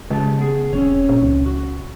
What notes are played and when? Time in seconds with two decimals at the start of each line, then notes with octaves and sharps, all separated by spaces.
0.10 C#3 G#3 G4 A5
0.39 B3 G#4
0.73 E1 C4 C#4 C#5
1.09 A#2
1.22 C#2
1.46 F#4